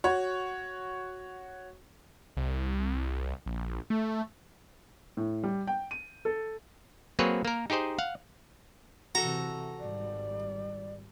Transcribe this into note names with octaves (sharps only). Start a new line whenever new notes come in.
F#4 C#5
C2
A#1
A3
A2
G3
G5
D#7
A4
F#3 A#3 C4 G#4 B4 C#5
A#3 A#4
D#4 G4 G#4 C5 D#5
F5 F#5
C3 E3 F#4 A4 A#5
G#1 G3 D5